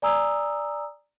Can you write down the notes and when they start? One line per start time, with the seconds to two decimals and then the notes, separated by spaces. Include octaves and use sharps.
0.02 D5 G#5 A#5 D#6 E6